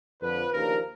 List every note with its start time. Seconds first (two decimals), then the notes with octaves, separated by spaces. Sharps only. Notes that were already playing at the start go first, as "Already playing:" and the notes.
0.21 F2 D3 F3 B4
0.52 D#2 C#3 F3 A#3 D4 A#4